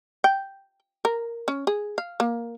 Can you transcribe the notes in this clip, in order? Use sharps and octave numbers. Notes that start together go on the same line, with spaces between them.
G5
A#4
C#4
G#4
F5
A#3